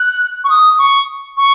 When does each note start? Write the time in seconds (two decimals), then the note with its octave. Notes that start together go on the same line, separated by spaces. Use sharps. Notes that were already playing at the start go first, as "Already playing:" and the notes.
Already playing: F#6
0.44 C#6
0.49 D#6
0.78 C#6
1.37 C#6